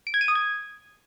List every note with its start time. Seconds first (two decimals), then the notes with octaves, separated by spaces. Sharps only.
0.07 D7
0.14 G#6
0.21 D#7
0.28 D#6
0.35 G#6